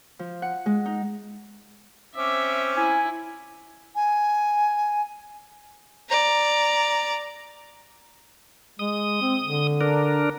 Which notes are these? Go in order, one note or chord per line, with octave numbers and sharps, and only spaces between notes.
F3
F#5
G#3
D#4
C4 C#4 E5 D6
E4 G#5
G#5
D5 A#5
G#3 D#6
C4
D3
D4 A#4